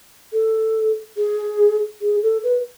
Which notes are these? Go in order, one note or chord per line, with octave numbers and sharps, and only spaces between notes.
A4
G#4
G#4
A4
B4